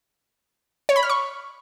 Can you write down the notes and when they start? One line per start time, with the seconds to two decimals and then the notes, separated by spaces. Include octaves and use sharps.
0.89 C#5
0.96 B5
1.03 F6
1.10 C#6